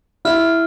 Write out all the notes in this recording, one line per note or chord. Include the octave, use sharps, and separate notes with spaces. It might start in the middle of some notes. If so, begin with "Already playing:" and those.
E4 F6